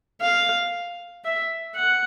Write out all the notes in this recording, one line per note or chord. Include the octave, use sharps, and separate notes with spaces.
F5
E5
F#5